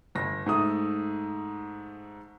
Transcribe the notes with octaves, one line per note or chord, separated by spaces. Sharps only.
G1 A#6
G#2 A3 D#6